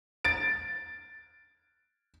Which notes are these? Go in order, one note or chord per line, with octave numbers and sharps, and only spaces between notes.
A6 D7